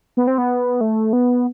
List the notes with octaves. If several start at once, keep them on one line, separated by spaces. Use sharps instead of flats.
B3
C4
B3
A3
B3